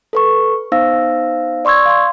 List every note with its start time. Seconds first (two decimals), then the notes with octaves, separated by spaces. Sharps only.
0.13 A4 B4 C#6
0.72 B3 D#4 C5 F5 E6 A#6
1.65 D5 C6 C#6 E6 G#6
1.86 F5 C6